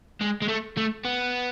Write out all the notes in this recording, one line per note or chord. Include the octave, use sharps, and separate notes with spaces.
G#3
G#3
A3
A3
B3